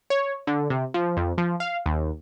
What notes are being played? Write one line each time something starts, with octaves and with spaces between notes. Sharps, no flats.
C#5
D3
C3
F3
F2
F3
F5
D#2